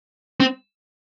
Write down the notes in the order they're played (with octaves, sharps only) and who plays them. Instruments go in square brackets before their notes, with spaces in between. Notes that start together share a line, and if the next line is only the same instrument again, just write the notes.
[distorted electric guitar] C4